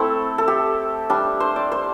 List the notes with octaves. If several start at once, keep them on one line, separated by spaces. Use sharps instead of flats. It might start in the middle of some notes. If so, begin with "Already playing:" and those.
Already playing: A3 C4 E4 A4
A4
G4
G3 D4
C5
D5
C5